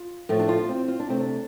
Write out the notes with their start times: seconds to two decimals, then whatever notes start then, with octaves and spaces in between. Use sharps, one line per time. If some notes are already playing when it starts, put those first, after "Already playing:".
Already playing: F4
0.29 A2 F3 A3
0.39 D4
0.49 F4
0.64 D4
0.69 C4
0.88 F4
1.00 D4
1.08 C3 A3 C4
1.20 D4